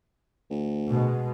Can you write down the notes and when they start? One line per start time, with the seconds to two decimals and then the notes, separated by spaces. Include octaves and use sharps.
0.50 D2
0.89 B2 G#3